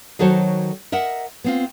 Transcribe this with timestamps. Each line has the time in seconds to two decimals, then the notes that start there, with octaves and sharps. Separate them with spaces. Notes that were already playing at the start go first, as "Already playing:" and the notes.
0.19 D#3 F#3 F#4 A4 C5 C#5
0.92 A#4 D#5 E5 F#5
1.44 B3 C4 F4